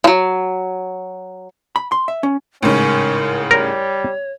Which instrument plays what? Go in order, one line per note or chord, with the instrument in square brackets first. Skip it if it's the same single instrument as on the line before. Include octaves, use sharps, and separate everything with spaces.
[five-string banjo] F3 F#3
[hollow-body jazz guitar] B5
C6
E5
C#4
[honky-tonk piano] A1 G#2 C#3 [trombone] C#4 [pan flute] A#4
[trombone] G3 [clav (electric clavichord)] A#4 [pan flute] C#5